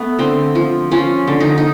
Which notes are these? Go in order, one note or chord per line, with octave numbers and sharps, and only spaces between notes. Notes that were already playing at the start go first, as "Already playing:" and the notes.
Already playing: A3 B3
D3 C4
F3
F3 C#4
D3
D#4
D#4